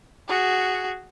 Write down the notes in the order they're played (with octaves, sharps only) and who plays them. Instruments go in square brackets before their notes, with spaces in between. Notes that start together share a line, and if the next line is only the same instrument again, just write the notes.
[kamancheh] F#4 G#4